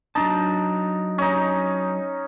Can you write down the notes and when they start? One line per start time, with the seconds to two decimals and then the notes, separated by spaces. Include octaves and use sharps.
0.15 F#3 D4 D#4 A5
1.18 C#4 D#4